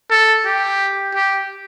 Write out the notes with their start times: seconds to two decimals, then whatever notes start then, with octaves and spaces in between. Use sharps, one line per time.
0.10 A4
0.45 G4
1.14 G4